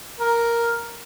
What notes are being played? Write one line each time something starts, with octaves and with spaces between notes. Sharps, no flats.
A#4